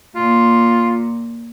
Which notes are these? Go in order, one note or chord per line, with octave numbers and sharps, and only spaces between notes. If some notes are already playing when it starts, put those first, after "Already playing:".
A#2 F4